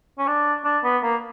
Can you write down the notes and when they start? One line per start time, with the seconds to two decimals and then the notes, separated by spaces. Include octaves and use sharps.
0.18 C#4
0.27 D4
0.65 D4
0.84 B3
1.03 A#3